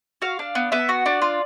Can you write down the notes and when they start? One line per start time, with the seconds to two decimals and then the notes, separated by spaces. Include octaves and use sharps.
0.22 F#4 F5
0.39 D4
0.55 B3
0.72 B3 E5
0.89 F#4
1.06 D4 D5
1.22 F4